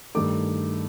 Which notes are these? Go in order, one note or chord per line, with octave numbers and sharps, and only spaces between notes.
G2 D#3 A3 D6